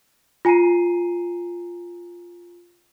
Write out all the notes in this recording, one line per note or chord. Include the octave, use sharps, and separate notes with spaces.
F4 G#5 A#5 C7 D#7